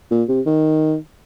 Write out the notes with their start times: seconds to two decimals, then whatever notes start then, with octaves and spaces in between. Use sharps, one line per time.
0.11 A#2
0.28 C3
0.46 D#3